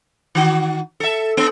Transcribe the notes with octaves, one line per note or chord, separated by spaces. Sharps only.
D#3 F#4
A4 E5
B3